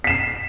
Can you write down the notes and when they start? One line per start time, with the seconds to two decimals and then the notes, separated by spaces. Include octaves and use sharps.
0.04 B6
0.07 E7
0.10 C7